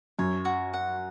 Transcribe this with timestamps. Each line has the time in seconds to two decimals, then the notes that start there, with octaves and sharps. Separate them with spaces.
0.19 F#2 C#5
0.45 F#4
0.74 F#5